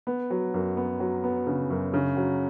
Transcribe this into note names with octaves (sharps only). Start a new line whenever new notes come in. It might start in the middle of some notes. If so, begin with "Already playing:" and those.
B3
F#3
F#2
B3
F#3
B3
C#3
F#2
C#3
F#3